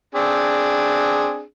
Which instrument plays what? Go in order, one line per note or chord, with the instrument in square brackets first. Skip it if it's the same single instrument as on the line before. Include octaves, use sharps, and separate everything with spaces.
[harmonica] C4 D4 G#4